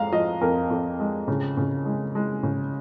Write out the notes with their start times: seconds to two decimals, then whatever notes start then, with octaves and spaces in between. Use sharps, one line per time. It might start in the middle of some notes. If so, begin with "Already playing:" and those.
Already playing: F2 G#3 F5 A#5
0.12 F3 D#5
0.41 F2 A#4
0.70 F2
0.99 G#3
1.28 C#3
1.57 C#3
1.86 G#3
2.15 G#3
2.43 C#3